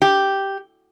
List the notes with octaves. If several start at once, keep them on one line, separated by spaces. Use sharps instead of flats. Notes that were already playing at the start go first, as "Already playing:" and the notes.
G4